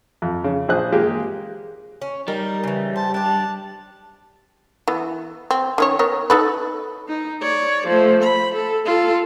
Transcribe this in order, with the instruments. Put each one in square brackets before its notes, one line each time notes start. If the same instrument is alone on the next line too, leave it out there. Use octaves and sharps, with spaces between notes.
[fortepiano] F2
C#3
A#1 G#4 C5 F#6
G#3 A#3 G4 G#4
[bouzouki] C#4
[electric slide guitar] G3 [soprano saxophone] D#4 [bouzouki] A#4
[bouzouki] C#3 E3
[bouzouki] C5 [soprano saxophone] A5
[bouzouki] D4 G4 [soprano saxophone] A5
[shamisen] E3 B3
C4
D#3 C#4 C#5
B3 A#4 C#5
D#4 A4 B4
[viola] D#4
C#5 D5
F3 A3
B5
A4
F4 A4